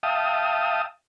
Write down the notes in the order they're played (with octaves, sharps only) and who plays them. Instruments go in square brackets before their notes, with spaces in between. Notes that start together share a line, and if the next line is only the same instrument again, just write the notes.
[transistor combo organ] E5 F5 G5 A5 D#6